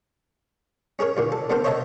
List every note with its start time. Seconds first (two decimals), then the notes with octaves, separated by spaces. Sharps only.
0.99 C#4 G#4 A#4 C#5
1.17 D#2 A#2 D3
1.32 A4
1.50 D3 B3 C4 A4 A#4 C5
1.64 C5 C#5 D#5 E5 A5 A#5